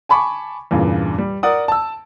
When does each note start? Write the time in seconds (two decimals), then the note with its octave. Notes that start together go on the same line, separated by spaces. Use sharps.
0.09 G#5 A5 B5 C#6 D6
0.71 E2 G2 A#2 C#3
1.18 G3
1.43 A#4 D5 F#5 D#6
1.68 A5 E6